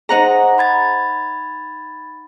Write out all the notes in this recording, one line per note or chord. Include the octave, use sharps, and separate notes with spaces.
D#4 G#4 C5 F#5 A#5
B5 G#6 A6